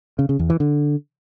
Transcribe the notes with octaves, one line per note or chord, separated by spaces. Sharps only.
C#3
C#3
E2
E3
D3